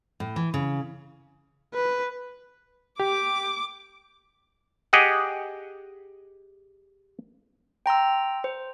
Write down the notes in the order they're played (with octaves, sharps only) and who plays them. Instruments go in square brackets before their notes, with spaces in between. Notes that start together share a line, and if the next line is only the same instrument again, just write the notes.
[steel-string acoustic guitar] A2
E3
C#3
[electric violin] B4
[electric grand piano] G4 [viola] D6
[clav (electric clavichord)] G4 G#4 D#5 F#5
[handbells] G5 A#5 C6 E6
C5